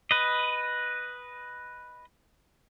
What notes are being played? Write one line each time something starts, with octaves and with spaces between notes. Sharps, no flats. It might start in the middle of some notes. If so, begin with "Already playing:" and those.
B4 D#5